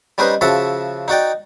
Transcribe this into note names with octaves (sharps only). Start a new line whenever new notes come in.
G3 C#4 D#4 B4 C5 D#5
C#3 F3 F#4 E5 A5
D#4 F#4 D5 G5